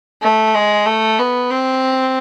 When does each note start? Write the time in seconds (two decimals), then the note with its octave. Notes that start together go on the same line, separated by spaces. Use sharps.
0.22 A3
0.54 G#3
0.86 A3
1.18 B3
1.50 C4